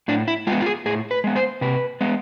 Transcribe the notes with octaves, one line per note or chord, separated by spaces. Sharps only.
A2 D4
E4
G#3 B3 F4
F4
G#4
A2 G#4
B4
G#3 B3
C5
C3 B4
G#3 B3